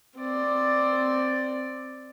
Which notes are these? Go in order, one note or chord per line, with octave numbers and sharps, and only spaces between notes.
C4 D5